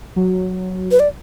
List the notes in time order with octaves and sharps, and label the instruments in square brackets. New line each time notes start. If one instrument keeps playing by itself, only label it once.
[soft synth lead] F#3
[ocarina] B4
D5